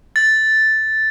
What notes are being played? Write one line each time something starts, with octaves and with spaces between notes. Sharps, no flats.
A6